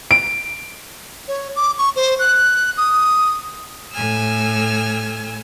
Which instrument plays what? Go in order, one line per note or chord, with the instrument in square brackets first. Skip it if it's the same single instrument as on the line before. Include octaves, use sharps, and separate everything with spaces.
[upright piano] D7
[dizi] C#5
D6
C#6
C5
F#6
D#6
[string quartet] A2 G#5 E6 F6